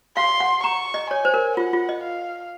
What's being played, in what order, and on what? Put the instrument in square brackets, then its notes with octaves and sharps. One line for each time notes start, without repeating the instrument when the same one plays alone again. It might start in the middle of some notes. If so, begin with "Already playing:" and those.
[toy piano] F5 [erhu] C6
[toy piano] F#5
[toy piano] A#5 [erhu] C#6
[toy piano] D#5
[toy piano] C#5 [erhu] G#5
[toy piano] C5
A#4
[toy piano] F4 [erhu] F#5
[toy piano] F4
D#5
[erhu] F5